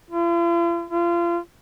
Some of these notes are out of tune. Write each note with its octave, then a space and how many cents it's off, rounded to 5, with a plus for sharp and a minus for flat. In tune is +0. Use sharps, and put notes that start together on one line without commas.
F4 -45
F4 -30